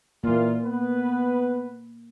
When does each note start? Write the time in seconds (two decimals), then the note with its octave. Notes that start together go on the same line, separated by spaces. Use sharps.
0.24 A#2 E3 A#3 F4
0.65 B3 B4